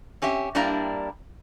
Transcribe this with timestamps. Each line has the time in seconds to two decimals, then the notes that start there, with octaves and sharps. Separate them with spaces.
0.22 C4 C#4 G4 E5
0.55 G2 G3 A#3 D4 E4 A#5